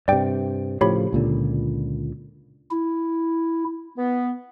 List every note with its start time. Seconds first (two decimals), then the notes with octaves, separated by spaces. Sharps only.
0.08 G2 C3 D5 G5
0.81 A2 C#3 F3 G4 C#5 B5
1.13 C#2 A#2 D3
2.71 E4
3.96 B3